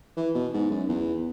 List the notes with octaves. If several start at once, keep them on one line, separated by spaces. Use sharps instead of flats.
E3
B2
G#2
F#2
E2